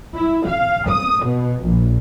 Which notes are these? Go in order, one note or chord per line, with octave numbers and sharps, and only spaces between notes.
E4
F5
D#6
B2
A#1